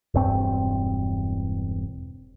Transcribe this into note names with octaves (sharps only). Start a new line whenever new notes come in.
E1 G2 C4